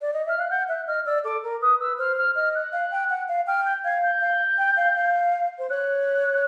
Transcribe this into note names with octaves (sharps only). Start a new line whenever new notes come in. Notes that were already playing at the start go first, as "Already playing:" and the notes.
D5
D#5
E5 F6
F5 F#6
F#5 G6
E5 F#6
D#5 F6
D5 E6
A4 D6
A#4
B4 D#6
B4 E6
C5 F6
F6
D#5 F6
F#6
F5
G5
F#5
F5
G5 F6
G6
F5 G#6
G6
F5
G5
F5
F5
C5
C#5 F#6